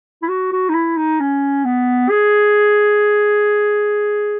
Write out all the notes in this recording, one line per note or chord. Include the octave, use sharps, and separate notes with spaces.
E4
F#4
F#4
D#4
E4
D#4
C#4
B3
G#4